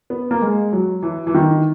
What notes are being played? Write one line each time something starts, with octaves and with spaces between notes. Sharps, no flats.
B3
A#3
G#3
F#3
E3
E3
D#3